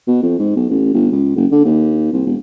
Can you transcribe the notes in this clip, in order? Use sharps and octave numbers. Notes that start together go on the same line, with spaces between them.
B2
F2
G#2
B1
A1
G1
C#2
F#1
D3
D#2
C2
E1